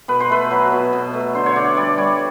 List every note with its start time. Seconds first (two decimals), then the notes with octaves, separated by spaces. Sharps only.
0.08 B2 B4
0.20 C5
0.29 A3 B4
0.51 F#3
0.72 B2
0.93 B2
1.13 A3
1.35 D3 C5
1.46 C#5
1.56 D3 D5
1.77 G3 D5
1.98 G3 C#5